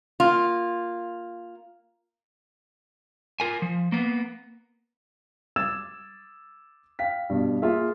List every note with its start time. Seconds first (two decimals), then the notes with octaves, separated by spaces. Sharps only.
0.20 A#3 F4
3.40 F4 A#4 G#5
3.62 F3
3.92 A#3 B3
5.56 D6 E6 G#6 A6 E7
6.99 F5 G5 B6
7.29 G2 B2
7.62 A#3 F4 G#4 E5 F5